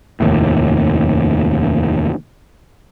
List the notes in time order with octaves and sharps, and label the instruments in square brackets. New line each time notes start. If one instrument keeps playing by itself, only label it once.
[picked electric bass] F1 D#2 A2